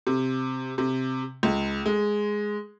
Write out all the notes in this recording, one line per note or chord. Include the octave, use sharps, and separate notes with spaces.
C3
C3
C#2
G#3